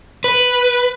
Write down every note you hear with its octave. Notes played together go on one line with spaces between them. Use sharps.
B4